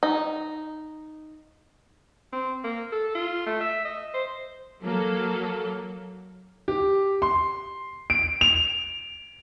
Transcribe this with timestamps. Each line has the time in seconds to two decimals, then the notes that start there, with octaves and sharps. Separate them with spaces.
0.03 D#4
2.33 C4
2.64 A#3
2.92 A4
3.15 F4
3.46 A3
3.61 E5
3.85 D#5
4.14 C5
4.82 F#3 A#3 A4
6.68 G4
7.22 C6
8.10 D7
8.41 F7